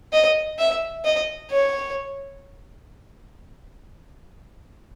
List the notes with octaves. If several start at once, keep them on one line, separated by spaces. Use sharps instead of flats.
D#5
E5
D#5
C#5